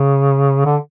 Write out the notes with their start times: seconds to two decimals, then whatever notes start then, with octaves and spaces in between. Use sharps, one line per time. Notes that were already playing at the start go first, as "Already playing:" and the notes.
Already playing: C#3
0.65 D3